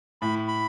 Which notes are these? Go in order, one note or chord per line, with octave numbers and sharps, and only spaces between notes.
A2 B5
B5